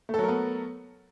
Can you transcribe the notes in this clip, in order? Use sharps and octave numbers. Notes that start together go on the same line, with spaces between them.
F#3 A3 B3 A4 A#4